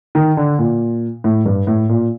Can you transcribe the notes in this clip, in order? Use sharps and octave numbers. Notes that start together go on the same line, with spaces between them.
D#3
D3
A#2
A2
G2
A2
A#2